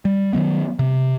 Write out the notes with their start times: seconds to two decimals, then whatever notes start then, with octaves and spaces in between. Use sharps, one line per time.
0.05 G3
0.33 D#3 E3 F#3 B3
0.79 C3